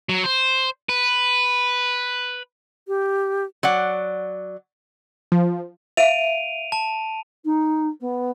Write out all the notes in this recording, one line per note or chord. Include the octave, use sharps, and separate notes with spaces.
F#3
C5
B4
G4
F#3 D5 F#5
F3
E5 F5 D7 D#7 F7
A5
D#4
B3